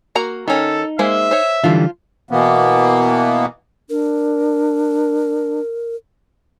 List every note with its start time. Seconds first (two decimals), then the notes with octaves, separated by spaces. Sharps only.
0.15 A#3 F#4 A#5
0.48 D#3 C#4 D#4 A4
0.99 G#3 A#3 C5 E5
1.31 C5 C#5
1.64 D3 E3 F3 G3 F4
2.31 B2 E3 A#3 B3
3.90 D4 A#4